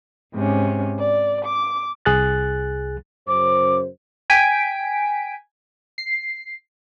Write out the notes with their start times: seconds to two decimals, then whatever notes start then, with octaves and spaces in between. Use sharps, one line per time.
0.34 G#2 C3 C#4
0.98 D5
1.44 D6
2.05 C2 G#4 F#6 A6
3.28 F#2 C#3 C5 D6
4.30 G5 G#5 B6 D7
5.98 C7